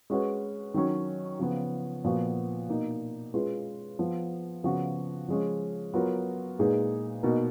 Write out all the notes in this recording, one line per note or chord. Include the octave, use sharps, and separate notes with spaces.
G#3 C#4 F#4 B4
D#3 F#3 C#4
C#3 F3 B3
A#2 F3 B3 F#4
B2 A#3 D#4
G#3 C#4 F4 G#4 B4
F3 B3 F4
C#3 F3 B3 F#4
F3 G#3 C#4
F#3 B3 F4 A#4
A#2 G#3 D#4 G#4 B4
B2 A#3 D#4 A#4